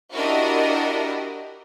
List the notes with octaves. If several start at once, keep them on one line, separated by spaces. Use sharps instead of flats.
D4 E4 F#4 G4 A#4 D#5